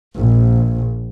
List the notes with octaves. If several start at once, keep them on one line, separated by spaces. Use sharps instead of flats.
A#1